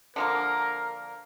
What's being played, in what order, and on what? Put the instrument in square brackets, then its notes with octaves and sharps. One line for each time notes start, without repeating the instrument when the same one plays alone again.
[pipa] D3 F3 A#3 [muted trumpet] A#4